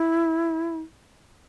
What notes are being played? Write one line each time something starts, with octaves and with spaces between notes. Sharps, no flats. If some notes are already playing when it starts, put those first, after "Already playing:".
Already playing: E4